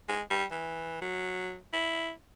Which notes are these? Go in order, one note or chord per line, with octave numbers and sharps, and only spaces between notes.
G#3
G3
E3
F#3
E4